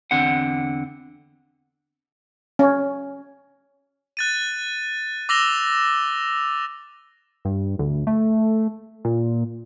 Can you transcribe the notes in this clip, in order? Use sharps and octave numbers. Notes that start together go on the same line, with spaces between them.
E2 D3 C4 D5 F#5
C#4
F#6 A6 D#7
D6 E6 A#6 F7 G7
G2
D2
A3
A#2